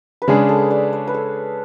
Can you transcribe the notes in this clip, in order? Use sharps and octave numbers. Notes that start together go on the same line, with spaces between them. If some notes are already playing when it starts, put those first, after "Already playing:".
B4
C#3 G#3 D4 G#4 C#5
A4
D5
C#5
B4
A4